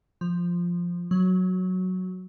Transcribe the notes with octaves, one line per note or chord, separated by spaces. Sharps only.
F3
F#3